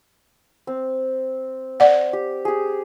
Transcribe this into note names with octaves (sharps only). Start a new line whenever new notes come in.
C4
D5 F#5
G4
G4 G#4